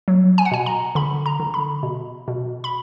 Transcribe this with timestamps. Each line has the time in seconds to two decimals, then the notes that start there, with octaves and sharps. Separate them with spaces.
0.08 F#3
0.38 G#5
0.45 F#5
0.51 B2 G#5
0.66 A#5
0.95 D3 B5
1.26 A#5
1.40 D3
1.54 B5
1.83 B2
2.28 B2
2.64 B5